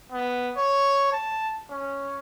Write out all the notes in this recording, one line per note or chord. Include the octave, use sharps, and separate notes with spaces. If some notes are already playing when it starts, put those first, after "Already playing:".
B3
C#5
A5
C#4